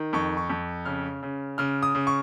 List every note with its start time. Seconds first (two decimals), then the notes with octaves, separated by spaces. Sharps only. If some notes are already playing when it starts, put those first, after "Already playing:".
Already playing: D#3
0.13 F2 C#6
0.37 C#6
0.50 F2
0.85 C#3 F6
1.23 C#3
1.58 C#3 F6
1.83 D#6
1.95 C#3
2.07 C#6